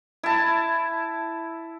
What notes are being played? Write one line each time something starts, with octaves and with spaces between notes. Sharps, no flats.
E4 A5